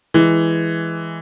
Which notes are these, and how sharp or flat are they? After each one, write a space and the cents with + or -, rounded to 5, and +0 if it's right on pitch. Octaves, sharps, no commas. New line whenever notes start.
E3 +0 G#3 +0